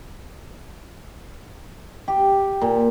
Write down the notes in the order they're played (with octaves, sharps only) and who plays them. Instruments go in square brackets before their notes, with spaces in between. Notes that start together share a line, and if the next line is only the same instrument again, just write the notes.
[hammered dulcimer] G4
A#2